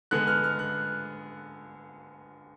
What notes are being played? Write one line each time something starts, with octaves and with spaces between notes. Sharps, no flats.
D3 G#3 B3 F#6
F6
F6
F#6